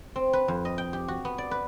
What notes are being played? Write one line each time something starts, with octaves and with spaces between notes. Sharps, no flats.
C4
B4
F2
D#5
G5
G4
F#4
B3
D5
B4